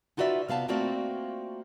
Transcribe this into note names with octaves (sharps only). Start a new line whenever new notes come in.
D#4 F4 F#4 B4 D5 E5
C3 B3 F5 A5
A3 A#3 C4 F4 F#4 D5